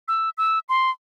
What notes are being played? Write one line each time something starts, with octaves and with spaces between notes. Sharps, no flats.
E6
E6
C6